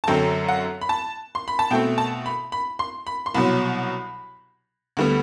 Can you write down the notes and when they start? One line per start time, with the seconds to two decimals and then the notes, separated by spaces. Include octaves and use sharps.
0.04 A5
0.07 F#2 D3 F#3 C4 G5
0.48 F#5
0.81 B5
0.89 A5
1.35 C6
1.48 B5
1.59 A5
1.70 B2 A3 C4 G5
1.98 A5
2.26 B5
2.52 B5
2.79 C6
3.07 B5
3.26 C6
3.34 C2 B2 F#3 B5
4.97 D2 D3 G3 B3